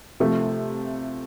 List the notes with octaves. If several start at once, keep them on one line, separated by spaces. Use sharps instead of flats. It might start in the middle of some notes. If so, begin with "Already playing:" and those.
C3 F3 A3